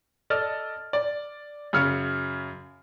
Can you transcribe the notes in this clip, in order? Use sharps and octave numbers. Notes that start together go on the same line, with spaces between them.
A4 D5 D#5 E6 F6 A6
D5
F#2 C#3 F6 C#7